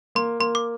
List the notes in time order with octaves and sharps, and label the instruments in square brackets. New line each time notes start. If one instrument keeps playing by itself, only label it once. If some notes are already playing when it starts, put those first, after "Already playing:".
[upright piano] A#3 [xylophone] C6
[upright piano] A#3 [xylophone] C6
[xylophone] D6